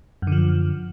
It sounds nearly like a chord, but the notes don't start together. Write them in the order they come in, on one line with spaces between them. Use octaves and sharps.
F#2 D3 F3